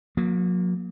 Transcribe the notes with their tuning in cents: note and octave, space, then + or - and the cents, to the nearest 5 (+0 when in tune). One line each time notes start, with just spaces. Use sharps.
F#3 -40 A#3 +5